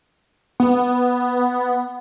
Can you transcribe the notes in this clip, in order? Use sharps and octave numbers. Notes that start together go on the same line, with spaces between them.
B3